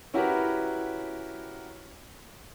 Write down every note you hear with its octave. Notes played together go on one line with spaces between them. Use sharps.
C#4 E4 F#4 G4 A#4 B4